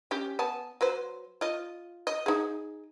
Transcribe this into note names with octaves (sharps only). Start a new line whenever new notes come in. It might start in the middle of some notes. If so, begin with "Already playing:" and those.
C#4 G4
B3 G#5 A5
F#3 B4 C5
F4 D#5
D#5
D#4 G#4